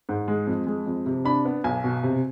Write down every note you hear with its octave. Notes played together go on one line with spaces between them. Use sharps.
G#2
G#3
F2
G#3
F2
C3
D4 B5
B3
B1 G#5
B2
C3